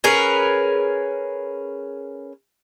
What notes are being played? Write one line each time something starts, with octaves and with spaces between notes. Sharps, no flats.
C#4 G#4 A#4 B4